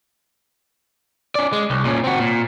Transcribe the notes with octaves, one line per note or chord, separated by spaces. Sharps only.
C#4 D5
G#3
C2
A#2 C#4
C4 F#4
A#2